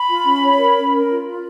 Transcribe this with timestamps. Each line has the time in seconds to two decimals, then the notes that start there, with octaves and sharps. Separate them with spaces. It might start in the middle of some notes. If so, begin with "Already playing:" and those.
Already playing: B5
0.09 F4
0.26 C#4
0.42 C#5
0.59 A#4
0.77 C#4
0.93 A#4
1.10 F4
1.26 F4